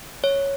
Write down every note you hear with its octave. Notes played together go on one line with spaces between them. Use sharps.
C#5